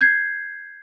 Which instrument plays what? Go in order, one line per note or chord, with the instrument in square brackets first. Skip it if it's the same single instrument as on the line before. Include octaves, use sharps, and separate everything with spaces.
[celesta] G6 G#6 C7